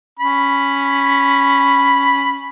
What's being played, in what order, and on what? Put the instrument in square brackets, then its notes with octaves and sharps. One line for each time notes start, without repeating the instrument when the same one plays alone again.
[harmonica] C#4 B5